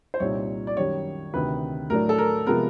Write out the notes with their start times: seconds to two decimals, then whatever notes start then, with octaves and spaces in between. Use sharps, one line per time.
0.14 C5
0.20 C2 A#2 G3 C4 D#4 C#5
0.67 D5
0.77 F#2 D#3 G3 C#5
1.34 D2 C3 D#3 B4
1.90 A2 F#3 A3 D4 A#4
2.09 A4
2.18 A#4
2.47 C3 F3 G#3 B3 A#4